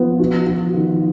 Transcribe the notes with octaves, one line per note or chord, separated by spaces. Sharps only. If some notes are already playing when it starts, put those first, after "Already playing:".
Already playing: F3 B3 F4
F#4
F#4
D#3